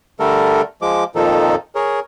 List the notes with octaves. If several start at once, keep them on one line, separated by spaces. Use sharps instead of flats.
D3 G3 A3 A4 A#4
F3 G#3 D6
F2 A#2 D#3 F3 D#4 A4
G#4 A#4 C#5